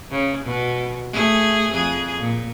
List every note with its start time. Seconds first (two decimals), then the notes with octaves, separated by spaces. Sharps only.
0.11 C#3
0.45 B2
1.12 A3 G#4
1.72 F2 G#4
2.21 A#2